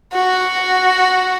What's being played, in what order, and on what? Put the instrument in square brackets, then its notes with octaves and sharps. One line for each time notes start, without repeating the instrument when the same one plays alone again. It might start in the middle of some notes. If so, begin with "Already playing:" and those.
[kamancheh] F#4